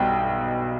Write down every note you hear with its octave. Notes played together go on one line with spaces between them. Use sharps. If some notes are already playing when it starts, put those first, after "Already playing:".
Already playing: B1 B2 G3 G5